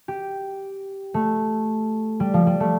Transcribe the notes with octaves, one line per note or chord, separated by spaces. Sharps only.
G4
A3
G3
F3
G3
A3